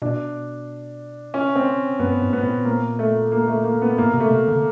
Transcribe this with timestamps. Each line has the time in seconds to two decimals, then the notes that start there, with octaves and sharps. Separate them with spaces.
0.02 B2 D4
1.34 C#4
1.56 C4
1.99 G2 B3
2.21 G#2
2.33 B3
2.43 A#2
2.65 A#3
2.99 A3
3.32 A#3
3.48 A3
3.64 A#3
3.82 B3
3.98 A2 A#3
4.14 C3
4.20 A3
4.31 C3
4.48 D3